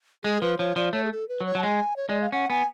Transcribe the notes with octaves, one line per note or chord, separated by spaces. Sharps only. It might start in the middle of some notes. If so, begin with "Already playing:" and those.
G#3 G#4
F3 B4
F3 C#5
F3 D5
A3 C#5
G#4
A4
B4
F#3
C#5
F#3 A5
G#3 G#5
C#5
G#3 D5
F5
C#4 F#5
B3 G#5